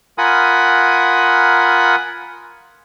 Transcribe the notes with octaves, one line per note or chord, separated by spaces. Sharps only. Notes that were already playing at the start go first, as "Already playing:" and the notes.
F4 A#4 F#5 G#5 B5 D#6